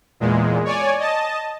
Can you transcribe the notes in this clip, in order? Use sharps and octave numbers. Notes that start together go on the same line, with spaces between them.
E2 A#2 G#3
C#5 D5 G#5
D#5 A5